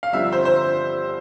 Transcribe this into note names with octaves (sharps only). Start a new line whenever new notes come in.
F5
G1 G2 D3 F3 C4 E5
C5
C5